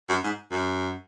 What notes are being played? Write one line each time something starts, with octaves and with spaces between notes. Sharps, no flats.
F#2
G#2
F#2